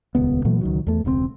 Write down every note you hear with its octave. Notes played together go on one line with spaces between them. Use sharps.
D#1 C#2 B3
A#2 E3 F#3 A3
C#2 D#3 F#3
E2 A3
E1 C#2 G#2 C4